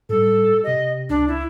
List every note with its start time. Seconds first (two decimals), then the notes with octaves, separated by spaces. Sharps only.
0.09 A2 G3 A4
0.64 C3 G4 D#5
1.09 C#2 D4
1.28 E4